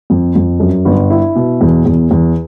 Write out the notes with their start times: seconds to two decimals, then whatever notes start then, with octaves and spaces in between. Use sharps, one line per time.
0.10 F2
0.35 F2
0.60 F#2
0.85 G1
1.10 E4
1.36 B2
1.61 E2
1.85 E2
2.11 E2